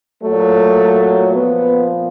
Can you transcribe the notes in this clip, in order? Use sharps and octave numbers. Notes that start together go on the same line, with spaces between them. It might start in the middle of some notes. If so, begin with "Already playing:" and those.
A#2 F#3 A3
A#2 F3 B3